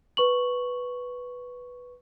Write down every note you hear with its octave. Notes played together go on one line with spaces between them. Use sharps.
B4 C#6 F#7